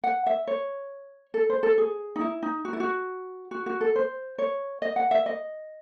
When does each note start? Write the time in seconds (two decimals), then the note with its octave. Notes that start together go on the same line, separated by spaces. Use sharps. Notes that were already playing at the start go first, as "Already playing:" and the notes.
0.04 F#5
0.26 E5
0.47 C#5
1.34 A4
1.50 C5
1.63 A4
1.78 G#4
2.16 D#4
2.21 E4
2.43 D#4
2.65 F#4
2.73 E4
2.80 F#4
3.51 F#4
3.66 F#4
3.81 A4
3.96 C5
4.38 C#5
4.82 D#5
4.96 F#5
5.11 E5
5.26 D#5